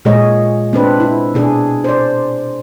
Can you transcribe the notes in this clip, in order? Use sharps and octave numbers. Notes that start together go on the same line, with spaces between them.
A#2 G#3 G#4 C#5 D#5
C4 D4 B4
E4
B2 D4 G#4
C5 D5